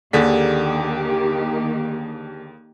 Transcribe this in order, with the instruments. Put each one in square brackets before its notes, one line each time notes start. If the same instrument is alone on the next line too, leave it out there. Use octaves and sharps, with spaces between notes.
[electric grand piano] D#2 G#4 B6 [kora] D3 [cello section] D#3 A#3 G4